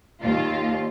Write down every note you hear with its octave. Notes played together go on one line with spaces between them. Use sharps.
D#2 F4